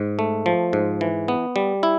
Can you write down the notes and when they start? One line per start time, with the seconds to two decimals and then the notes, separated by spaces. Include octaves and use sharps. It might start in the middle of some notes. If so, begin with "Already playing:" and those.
Already playing: G#2
0.19 A3
0.46 F3
0.73 G#2
1.01 E3
1.28 B3
1.56 G3
1.83 E4